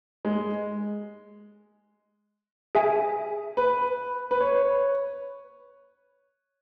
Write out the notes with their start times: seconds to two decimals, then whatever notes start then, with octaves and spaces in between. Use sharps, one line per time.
0.25 G#3
2.75 G#4 E5 G#5
3.57 B4
4.31 B4
4.40 C#5